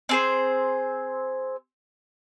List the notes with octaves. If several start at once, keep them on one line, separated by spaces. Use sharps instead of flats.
C4 G#4 C5